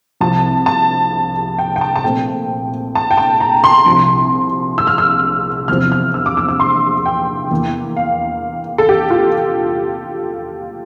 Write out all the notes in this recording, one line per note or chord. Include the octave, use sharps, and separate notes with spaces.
C2 C3 F3 A5
A5
G5
G5
A5
A5
A#2 A3 C4 G5
A5
G5
A5
A#5
C6
C2 C3 F3
E6
F6
E6
E2 C3 F3 C4 F6
F6
E6
D6
E6
E6
C6
G5
E2 E3 A#3
F5
A4
G4
F4